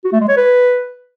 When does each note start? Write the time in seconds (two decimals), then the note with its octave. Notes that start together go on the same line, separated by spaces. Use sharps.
0.04 F#4
0.12 A3
0.21 G#3
0.29 C#5
0.37 B4